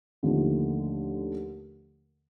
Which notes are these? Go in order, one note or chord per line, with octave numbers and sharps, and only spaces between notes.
D#2 D3 F3 A3